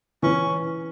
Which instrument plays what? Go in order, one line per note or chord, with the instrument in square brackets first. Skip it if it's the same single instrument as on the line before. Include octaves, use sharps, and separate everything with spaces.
[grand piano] E3 [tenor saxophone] C#4